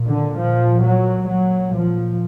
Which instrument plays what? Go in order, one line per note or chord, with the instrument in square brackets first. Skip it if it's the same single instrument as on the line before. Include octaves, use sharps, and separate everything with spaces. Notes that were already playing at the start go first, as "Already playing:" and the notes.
Already playing: [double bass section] A#2
D3
F3
F#3
A#2 F#3
F3